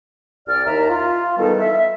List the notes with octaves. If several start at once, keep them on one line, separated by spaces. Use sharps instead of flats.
C2 D5 F6
D#2 E5 A#5
F4
D#3 E3 G3 B3 D#4 A4
E5